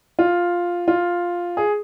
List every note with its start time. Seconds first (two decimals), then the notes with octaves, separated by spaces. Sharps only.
0.19 F4
0.88 F4
1.57 G#4